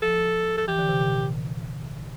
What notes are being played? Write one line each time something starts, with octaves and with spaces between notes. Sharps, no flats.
F3 A4
A4
E3 G4
D3
C3
A#2